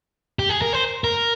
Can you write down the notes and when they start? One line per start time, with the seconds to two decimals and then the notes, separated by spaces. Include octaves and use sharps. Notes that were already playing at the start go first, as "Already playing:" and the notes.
0.39 G4
0.49 G#4
0.62 A#4
0.73 C5
1.04 A#4